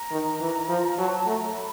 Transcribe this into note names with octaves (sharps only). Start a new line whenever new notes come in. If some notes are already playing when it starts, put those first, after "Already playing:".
Already playing: A#5
D#3
E3
F3
F#3 A5
A3 A#5
B5